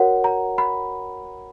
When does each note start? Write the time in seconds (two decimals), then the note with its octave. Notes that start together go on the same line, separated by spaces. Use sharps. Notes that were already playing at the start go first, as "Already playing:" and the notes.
Already playing: F#4 A#4 C#5 F#5
0.24 A#5
0.58 B5